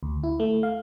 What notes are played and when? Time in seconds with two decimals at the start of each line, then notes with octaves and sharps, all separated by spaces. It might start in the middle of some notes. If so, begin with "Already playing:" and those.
0.03 D2
0.23 E4
0.40 A3
0.63 F5